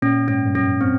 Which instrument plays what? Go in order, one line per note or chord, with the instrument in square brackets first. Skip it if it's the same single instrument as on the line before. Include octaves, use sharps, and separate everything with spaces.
[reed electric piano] A#2 [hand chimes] C#4
[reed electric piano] G#2 [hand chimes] C#4
[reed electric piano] G2
[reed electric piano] F#2 [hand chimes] C#4
[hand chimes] C4